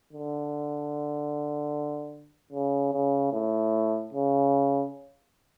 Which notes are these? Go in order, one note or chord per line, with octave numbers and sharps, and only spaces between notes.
D3
C#3
C#3
A2
C#3